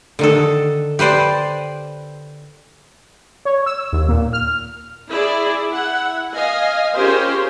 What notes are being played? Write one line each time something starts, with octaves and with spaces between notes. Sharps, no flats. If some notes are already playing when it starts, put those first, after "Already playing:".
D3 D#3 A4
G4 B4 C5 D5
C#5
E6
D#2
A#2
F6
E4 G#4 D5
E4 F#5
D#5 F5 G#5
C#4 F4 G4 G#4 A#4 C5